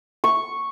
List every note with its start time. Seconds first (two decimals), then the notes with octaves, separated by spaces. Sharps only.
0.24 C#6